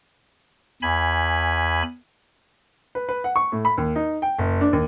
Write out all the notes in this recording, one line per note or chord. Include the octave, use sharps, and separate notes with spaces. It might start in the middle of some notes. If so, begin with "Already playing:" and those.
E2 G#5 B5
B4
B4
F#5
C#6
A2
B5
D#2
D#4
G5
F#1
D4
D#2